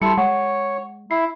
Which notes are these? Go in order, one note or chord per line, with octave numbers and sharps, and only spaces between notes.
G3 E4 A4 C6 C#7
G#3 C#5 F#5
E4 C7